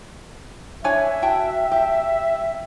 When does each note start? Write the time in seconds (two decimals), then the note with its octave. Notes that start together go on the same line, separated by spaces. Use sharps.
0.84 D4 C#5 E5 G#5
1.22 F#4 G5 A5
1.71 G4